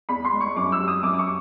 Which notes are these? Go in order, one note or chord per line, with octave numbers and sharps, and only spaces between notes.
E2 B5
C6
G#3
C#6
F#2 D6
E6
G3
D#6
F#2 D6
D6
C#6